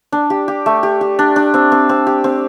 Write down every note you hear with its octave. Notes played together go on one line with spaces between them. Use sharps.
D4
G4
G4
A3
G4
G4
D4
D4
C4
C4
C4
G4
C4